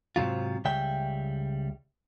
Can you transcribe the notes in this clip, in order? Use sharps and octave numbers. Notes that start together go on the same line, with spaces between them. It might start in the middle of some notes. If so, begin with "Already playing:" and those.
G#2 C3 F#3 F4
C#2 C#3 G3 E5 G5